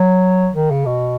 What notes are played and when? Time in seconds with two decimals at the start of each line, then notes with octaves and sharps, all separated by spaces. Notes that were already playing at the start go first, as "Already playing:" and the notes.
Already playing: F#3
0.55 D#3
0.71 C#3
0.86 B2